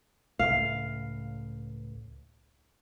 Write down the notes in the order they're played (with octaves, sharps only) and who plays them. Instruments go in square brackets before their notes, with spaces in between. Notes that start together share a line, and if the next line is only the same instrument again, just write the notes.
[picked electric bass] C#2 A2 [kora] F5